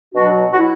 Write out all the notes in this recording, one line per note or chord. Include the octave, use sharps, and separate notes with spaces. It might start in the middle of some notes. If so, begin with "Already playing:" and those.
B2 F#3 D4 F#4
F#4
E4